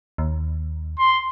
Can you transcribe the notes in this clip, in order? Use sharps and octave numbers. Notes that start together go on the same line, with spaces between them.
D#2
C6